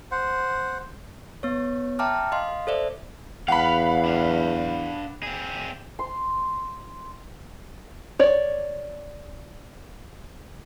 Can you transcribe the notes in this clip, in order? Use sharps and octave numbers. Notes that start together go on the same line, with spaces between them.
C5 F#5
B3 C#5
E5 G5 A5 A#5 D6 F6
D#5 F5 C6
A4 C5 D5 E5
E2 F5 F#5 B5
D4 F5
C4 G#4
C6
C#5 D5